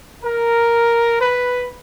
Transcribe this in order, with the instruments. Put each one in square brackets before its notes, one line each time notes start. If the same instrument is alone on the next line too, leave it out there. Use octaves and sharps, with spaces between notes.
[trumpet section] A#4
B4